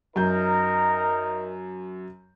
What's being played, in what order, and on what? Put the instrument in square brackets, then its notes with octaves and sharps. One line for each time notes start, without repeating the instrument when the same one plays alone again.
[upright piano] F#2 G6 [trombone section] D#4 A#4